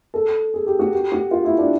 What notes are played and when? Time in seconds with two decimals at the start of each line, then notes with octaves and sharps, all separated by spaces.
0.14 A4
0.54 G#4
0.66 G4
0.79 F#4
0.93 G4
1.12 F#4
1.31 F4
1.45 E4
1.58 D4